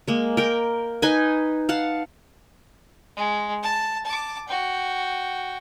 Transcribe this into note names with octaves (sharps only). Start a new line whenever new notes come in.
G#3 A#3
A#4 G5
D#4 B4 D#5 G#5
F5 F#5 A5
G#3
A5
A5 D6
F#4 G5